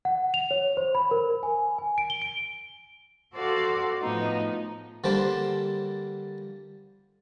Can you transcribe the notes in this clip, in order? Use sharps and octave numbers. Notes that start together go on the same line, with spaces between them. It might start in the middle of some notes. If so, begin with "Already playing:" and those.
F#5
F7
C#5
C5
B5
A#4
G#5
G#5
D7
G7
D7
F#4 A4 C5 D5 F5 F#5
A2 F3 B3 D#4
D3 G3 A#3 C5 A5 D6